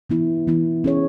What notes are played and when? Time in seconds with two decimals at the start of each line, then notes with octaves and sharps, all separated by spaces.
0.10 E3 B3 E4
0.47 E3 B3 E4
0.84 C#4 G#4 C#5